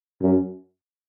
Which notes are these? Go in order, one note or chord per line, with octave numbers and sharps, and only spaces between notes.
F#2